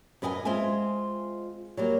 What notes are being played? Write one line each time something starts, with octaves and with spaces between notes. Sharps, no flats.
F#2 B4 D#5 G5 G#5
G#3 C4 F4 E5 G#5
F#3 G3 A#3